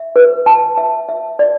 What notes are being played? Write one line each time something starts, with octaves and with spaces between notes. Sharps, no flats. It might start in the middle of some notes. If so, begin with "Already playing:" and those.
Already playing: E5
B4
A5
E5
E5
D5